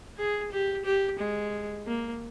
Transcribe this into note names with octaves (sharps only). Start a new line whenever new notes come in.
G#4
G4
G4
G#3
A#3